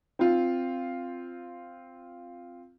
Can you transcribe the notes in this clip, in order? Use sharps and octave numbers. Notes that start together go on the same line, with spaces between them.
C4 F4